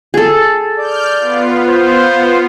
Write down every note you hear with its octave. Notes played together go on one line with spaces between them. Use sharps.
G#4 A4
D5 F6 G6
B3 F4
C5